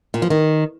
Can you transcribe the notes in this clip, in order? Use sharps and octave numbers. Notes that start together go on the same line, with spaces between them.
A#2
F3
D#3